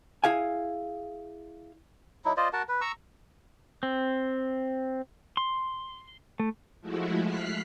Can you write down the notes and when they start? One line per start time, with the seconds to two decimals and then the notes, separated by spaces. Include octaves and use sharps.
0.24 E4 G#4 F5 G#5
2.25 F#3 D#4 E4
2.37 F4 C5 D5 D#5
2.53 F#4 A#4 F#5 A5
2.68 B4
2.81 A#5 C#6 E6
3.83 C4
5.37 C6
6.40 A3
6.81 F3 G#3 A3 E4 F#4
7.23 F6 F#6 B6 C7